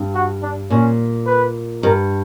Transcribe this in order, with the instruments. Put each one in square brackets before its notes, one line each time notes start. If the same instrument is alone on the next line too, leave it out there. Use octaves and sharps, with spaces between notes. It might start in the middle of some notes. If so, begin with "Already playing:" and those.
Already playing: [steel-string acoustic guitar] G2
[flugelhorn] F#4
D4
[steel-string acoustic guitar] A#2 [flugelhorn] C#4
[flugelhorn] B4
[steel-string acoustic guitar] G2 [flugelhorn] A#4